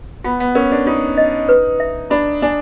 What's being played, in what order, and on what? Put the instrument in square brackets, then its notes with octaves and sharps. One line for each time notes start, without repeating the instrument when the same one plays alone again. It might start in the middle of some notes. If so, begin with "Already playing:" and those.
[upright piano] B3 [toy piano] F4
[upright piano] B3
[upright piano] C#4 [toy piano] A#4
[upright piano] D4
[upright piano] D#4 [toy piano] F4
[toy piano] D#5
B4
E5
[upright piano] D4 [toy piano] B5
[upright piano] D4 [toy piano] G#5